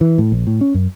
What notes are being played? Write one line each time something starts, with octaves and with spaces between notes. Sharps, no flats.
E3
A2
A#1
A2
C#4
F#2